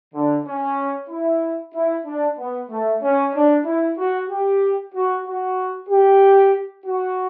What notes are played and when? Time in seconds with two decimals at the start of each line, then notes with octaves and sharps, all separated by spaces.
0.15 D3
0.46 C#4
1.09 E4
1.74 E4
2.06 D4
2.38 B3
2.70 A3
3.02 C#4
3.33 D4
3.65 E4
3.97 F#4
4.29 G4
4.94 F#4
5.25 F#4
5.89 G4
6.85 F#4